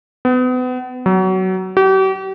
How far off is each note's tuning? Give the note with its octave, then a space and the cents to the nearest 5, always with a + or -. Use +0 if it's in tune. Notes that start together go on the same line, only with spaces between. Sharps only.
B3 +35
F#3 +20
G4 -40